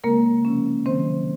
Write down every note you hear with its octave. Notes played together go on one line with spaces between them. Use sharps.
C#3 G#3 A#3 C4 A#4
C3 F3 A#3 C#4
C3 D#3 F#3 C4 C5